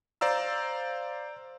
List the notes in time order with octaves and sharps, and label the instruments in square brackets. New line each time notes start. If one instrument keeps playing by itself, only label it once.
[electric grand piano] C5 D5 F5 A#5 E6